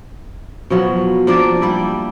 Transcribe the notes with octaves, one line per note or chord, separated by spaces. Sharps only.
B2 F3 F#3
F3 A#3 D4 D5
G3 E4 E5